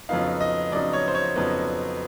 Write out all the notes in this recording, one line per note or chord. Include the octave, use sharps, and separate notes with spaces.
F2 C#3 F#3 B3 D#4 F5
D#5
F2 C#3 F#3 B3 D#4 D5
C#5
C5
C#5
F2 C#3 F#3 B3 D#4